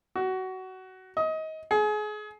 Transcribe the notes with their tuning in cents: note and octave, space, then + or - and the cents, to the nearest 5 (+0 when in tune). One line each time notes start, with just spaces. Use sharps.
F#4 +20
D#5 +25
G#4 +30